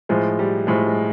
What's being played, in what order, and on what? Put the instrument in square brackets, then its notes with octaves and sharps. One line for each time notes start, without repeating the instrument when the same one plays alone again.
[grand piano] A2 F3 G#3
G3
A2 F3 G#3
G#3